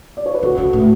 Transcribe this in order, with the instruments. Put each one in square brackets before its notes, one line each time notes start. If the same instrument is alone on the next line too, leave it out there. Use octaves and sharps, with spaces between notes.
[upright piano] D5
C#5
B4
[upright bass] C#3 [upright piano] F#4 A4
[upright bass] C#3
A2